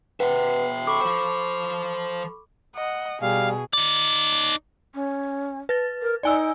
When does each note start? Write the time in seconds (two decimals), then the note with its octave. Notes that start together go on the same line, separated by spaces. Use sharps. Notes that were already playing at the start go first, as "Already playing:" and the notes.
0.20 B4 E5 F#5 G5
0.87 A4 B5 C#6 D6
1.01 F3 C5
2.75 D#5 F#5
3.22 B2 G3 G#4 F5
3.73 D#4 D5
4.94 C#4
5.69 B4 A6
6.02 A#4
6.23 D#4 D5 G#5 E6